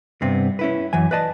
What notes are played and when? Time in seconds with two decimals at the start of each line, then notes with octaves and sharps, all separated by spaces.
0.22 G2 C3 B3 C4
0.59 C#4 E4 B4
0.93 F#2 E3 G#5
1.11 B4 D5 D#5 A5